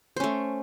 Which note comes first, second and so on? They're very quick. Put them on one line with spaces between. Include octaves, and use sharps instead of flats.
C5 C#4 A3